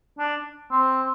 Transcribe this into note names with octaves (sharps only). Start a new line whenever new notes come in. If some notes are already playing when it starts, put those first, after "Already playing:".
D4
C4